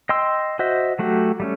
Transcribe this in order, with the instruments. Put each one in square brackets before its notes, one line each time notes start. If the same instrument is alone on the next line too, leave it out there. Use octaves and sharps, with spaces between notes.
[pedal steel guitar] D#5 G5 C6 E6
F#4 C5 D#5 E5
F#3 A3 F#4 G4
G3 A3 C#4